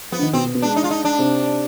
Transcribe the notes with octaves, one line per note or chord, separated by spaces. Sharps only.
F3 B3 F4
D4
D#3 D#4
B2 B3 C4
B2 B3
B2 B3
G#3 D4
D#4
F4
D#4
D4
C3 C4